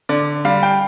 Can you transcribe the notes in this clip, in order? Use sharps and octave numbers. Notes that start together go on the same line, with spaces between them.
D3 D5
G3 F5
G5